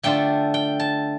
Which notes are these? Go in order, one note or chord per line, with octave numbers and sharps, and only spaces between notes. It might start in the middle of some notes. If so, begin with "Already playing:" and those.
D3 A3 D4 F4 G5
G5
A5